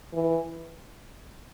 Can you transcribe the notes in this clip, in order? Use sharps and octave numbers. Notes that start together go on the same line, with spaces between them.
E3